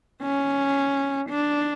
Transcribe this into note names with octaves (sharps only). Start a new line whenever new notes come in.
C#4
D4